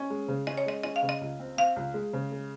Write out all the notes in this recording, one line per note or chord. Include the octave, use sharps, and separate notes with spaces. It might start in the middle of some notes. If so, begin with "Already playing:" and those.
Already playing: C#4 D#5
G#3
C#3
C#4 D#5
C#5
G#3 D#5
C#4 D#5
F5
C#3
D#5
C#2
C4
C4 F5
C#2
G#3
C#3
G#3